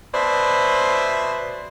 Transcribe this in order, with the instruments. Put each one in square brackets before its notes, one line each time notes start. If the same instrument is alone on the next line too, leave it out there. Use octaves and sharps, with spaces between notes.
[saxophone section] B2 B4 C5 D5 E5